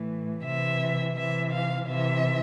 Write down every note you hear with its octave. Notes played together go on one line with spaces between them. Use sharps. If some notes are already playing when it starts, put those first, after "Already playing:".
Already playing: A2 E3
C3 E3 E5
C3 E3 E5
F5
C3 E3 E5